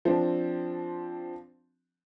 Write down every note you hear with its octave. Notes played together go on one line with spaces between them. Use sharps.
F3 C4 D4